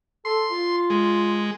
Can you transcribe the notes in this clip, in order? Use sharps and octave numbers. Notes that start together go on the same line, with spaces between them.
A4 C6
F4
G#3